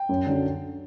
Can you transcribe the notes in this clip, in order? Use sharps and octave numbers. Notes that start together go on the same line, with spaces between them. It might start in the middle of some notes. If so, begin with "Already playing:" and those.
Already playing: G5
F#2
D3 F#3